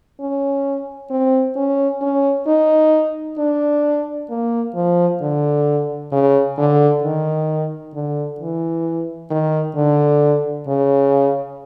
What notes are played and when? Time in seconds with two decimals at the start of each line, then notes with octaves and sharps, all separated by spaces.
0.20 C#4
1.11 C4
1.56 C#4
2.02 C#4
2.47 D#4
3.38 D4
4.30 A#3
4.75 F3
5.21 D3
6.12 C#3
6.58 D3
7.04 D#3
7.94 D3
8.40 E3
9.31 D#3
9.76 D3
10.68 C#3